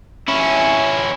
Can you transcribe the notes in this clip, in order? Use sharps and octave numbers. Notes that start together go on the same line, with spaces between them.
C#4 E4